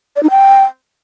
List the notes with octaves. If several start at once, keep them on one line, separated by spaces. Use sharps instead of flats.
D5
D#4
G5